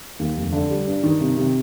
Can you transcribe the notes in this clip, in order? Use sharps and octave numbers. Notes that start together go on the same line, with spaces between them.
D#2
F1
D3
G3
G2
D#3
C3
C3